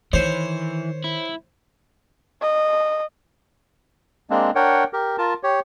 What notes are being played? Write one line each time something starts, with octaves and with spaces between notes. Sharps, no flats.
D#3 E3 C5 C#5
E4
D#5
G#3 A#3 C4 D4
D4 A#4 C#5 F#5 G5
G4 A#4
F4 A#4 A5
G4 C#5